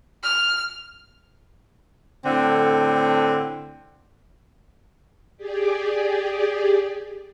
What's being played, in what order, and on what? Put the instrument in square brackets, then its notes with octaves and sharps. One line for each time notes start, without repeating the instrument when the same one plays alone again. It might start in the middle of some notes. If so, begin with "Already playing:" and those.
[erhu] F6
[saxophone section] A2 D3 C4
[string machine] G4 G#4 D5